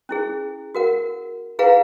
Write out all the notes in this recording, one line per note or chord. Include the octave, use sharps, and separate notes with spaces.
C#4 E4 G#4
F#4 A#4 F#5
E4 G#4 B4 F5 F#5 A#5